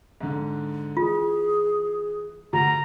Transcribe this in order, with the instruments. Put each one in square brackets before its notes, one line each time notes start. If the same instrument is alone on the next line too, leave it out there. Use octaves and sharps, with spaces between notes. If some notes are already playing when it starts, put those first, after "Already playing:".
[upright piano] G#2 D3
[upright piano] E3 [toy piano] F4 [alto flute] G#4
[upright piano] D2 [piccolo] A#5